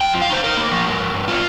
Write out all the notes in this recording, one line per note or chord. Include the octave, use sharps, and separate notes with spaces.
F2 G5
F3
F5
D#4 C5
D#4 A#4
A#3
F3
G2
G2
G2
G3 F4